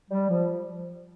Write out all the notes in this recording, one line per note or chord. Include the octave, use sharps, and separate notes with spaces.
G3
F3